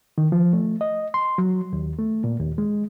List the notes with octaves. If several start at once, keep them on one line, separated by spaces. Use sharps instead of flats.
D#3
F3
A3
D#5
C6
F#3
D#2
A3
A#2
D#2
G#3